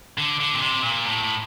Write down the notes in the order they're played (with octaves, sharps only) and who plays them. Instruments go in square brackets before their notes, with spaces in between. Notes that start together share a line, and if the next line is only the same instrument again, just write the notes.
[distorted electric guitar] D3
D3
A#2
C3
A#2
A2